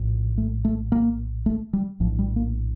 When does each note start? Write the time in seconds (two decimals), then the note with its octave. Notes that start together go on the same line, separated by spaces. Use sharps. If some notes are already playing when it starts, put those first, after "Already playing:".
Already playing: A#1 A2
0.38 A3
0.65 A3
0.92 A#3
1.46 A3
1.73 G3
2.00 A#1 A2 F3
2.19 G3
2.36 A#3